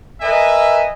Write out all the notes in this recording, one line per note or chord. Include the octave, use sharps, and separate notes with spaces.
A#4 B4 D#5 E5 G#5